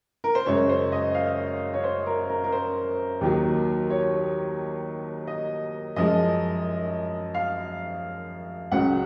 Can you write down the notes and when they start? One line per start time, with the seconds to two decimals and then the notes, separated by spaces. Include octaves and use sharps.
0.24 A#4
0.35 C5
0.46 F#2 C#3 G#3 C#5
0.69 C5
0.92 D#5
1.15 F5
1.74 C#5
1.84 C5
2.06 A#4
2.30 A#4
2.44 A#4
2.52 C5
3.21 D#2 D#3 F#3
3.90 C#5
5.27 D#5
5.96 F#2 F3 G#3 D#5
7.34 F5
8.71 C#2 C#3 F#3 F#5